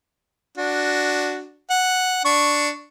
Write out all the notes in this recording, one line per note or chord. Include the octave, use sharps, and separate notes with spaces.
D4 F#4
F#5
D4 C#6